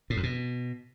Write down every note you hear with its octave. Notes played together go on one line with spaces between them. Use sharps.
A2
F2
B2